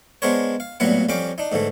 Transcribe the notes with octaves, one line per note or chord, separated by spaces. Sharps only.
G#3 B3 D4 A#4 C5 C#5
F5
A1 A#2 F#3 G3 B3 F#5
F2 G3 C#4 F5 G5 D6
D4 D#4
G#2 D3 E3 A3